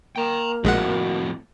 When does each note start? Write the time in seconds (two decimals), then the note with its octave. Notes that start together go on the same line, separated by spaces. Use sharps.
0.16 A#3 G5 A#5
0.64 A#1 F2 A2 G#3 F#4 F#5